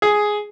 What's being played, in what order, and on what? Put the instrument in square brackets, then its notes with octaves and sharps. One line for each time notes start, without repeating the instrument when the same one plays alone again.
[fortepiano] G#4